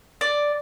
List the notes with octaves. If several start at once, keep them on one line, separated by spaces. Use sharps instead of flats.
D5